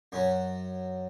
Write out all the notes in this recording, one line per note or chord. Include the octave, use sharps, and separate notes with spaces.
F#2 F#3 C#4